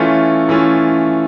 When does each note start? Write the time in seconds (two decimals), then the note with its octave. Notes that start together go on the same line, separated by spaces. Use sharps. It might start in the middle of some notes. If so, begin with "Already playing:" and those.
Already playing: E3 A3 C#4 F4
0.49 E3 A3 C#4 F4